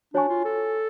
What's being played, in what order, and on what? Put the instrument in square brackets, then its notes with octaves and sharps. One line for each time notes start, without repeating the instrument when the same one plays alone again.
[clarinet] D4 [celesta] F#4 C#5 G#5 C#6
[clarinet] F4
A4